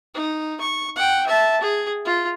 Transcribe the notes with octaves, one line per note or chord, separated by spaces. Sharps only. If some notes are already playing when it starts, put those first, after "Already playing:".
D#4
C#6
F#5 G5
E5 A5
G#4
F4